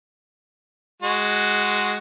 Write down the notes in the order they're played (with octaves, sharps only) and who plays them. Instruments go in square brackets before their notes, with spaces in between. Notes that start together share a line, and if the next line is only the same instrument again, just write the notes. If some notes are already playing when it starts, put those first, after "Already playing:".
[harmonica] G#3 F#4